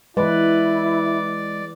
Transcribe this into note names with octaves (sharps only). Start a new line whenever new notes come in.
E3 G#3 E4 B4 D5